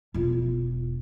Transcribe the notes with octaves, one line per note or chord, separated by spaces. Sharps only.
E1 F4